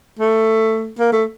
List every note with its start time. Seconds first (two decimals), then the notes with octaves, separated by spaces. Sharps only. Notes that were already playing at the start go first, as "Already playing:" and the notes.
0.19 A3
0.99 A#3
1.12 A3